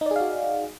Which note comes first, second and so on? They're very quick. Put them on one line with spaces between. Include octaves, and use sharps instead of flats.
D#4 D5 G#4 F5 F#4